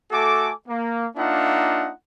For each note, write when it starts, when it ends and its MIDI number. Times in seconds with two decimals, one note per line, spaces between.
0.11 0.51 57
0.11 0.51 66
0.11 0.51 69
0.11 0.51 80
0.11 0.51 86
0.68 1.06 58
1.17 1.91 58
1.17 1.91 62
1.17 1.91 63
1.17 1.91 65
1.17 1.91 76
1.17 1.91 78